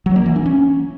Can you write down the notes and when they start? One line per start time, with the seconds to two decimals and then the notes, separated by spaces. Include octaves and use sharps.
0.06 F#3
0.16 A#3
0.26 E3
0.36 D4
0.46 C#4